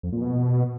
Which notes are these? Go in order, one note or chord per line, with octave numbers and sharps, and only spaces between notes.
F2
A#2
B2